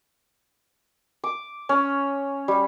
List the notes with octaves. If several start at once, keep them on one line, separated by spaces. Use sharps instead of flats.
D6
C#4
G3